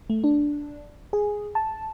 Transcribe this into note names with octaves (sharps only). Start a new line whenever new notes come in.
A3
D4
G#4
A5